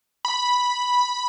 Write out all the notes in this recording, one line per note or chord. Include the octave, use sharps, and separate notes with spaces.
B5